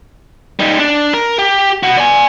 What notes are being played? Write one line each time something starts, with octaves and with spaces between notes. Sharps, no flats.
G3 D#4
D4
A#4
G4
B3 F#4
D5 G#5